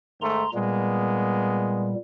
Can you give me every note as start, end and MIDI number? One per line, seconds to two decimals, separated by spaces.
0.21 0.43 44
0.21 0.43 51
0.21 0.43 57
0.21 0.50 82
0.21 0.50 84
0.54 1.95 46
0.54 1.95 55
0.54 2.00 56
0.54 2.00 58
0.54 2.00 59